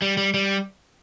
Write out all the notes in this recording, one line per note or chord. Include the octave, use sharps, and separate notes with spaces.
G3
G3
G3